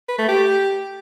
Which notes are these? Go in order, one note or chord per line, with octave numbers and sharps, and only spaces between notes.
B4
A3
G4